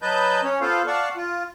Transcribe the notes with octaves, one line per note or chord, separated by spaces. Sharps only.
F#3 B4 D#5 A5 G6
C#4 C#5
B3 F4 A4 C5 F5
D5 F5 F#5 A5 C#6
F4